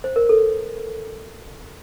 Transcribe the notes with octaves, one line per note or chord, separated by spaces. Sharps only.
C5
A#4
A4